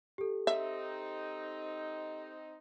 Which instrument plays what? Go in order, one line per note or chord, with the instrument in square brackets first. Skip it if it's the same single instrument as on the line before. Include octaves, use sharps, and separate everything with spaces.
[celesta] G4 A4
[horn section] C4 D#4 [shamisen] E5